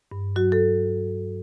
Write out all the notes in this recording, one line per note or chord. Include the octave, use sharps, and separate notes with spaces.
G2
F#3 F#4
A4